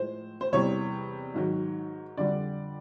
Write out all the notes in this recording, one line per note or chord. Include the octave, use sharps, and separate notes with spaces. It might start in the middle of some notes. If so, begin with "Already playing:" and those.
Already playing: A2 F3 G#3 C5
C5
E2 C3 E3 G3 C#5
G#2 D#3 F#3
F2 D3 G3 D5